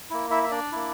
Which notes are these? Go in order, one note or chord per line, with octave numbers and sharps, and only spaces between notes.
A#3 E4
E4 E5
E5
D4 D5
A#3 E4